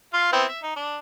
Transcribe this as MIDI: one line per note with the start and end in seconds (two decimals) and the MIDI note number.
0.13 0.29 65
0.13 0.29 77
0.32 0.44 59
0.32 0.44 60
0.32 0.44 64
0.49 0.60 76
0.63 0.73 63
0.76 0.98 62